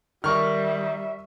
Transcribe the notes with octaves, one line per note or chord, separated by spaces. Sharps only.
D#3 G3 A#4 E5 C#6 F6